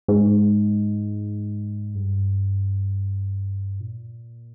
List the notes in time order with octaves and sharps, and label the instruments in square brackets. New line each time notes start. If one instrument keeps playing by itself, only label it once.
[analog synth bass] G#2
G2
A#2